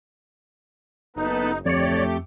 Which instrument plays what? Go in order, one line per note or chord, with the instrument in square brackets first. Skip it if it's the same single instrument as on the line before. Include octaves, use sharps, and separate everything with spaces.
[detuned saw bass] F#1 [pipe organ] B3 A4 B4 [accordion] D#4
[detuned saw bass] D1 [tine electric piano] F2 C#7 [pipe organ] A3 G4 [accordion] C#5 D5